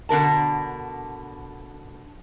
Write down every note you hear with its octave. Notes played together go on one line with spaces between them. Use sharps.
B2 D3 A#4 A5